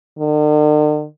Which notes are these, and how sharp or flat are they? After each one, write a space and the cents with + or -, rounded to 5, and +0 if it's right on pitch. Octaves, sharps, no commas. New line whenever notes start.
D3 +45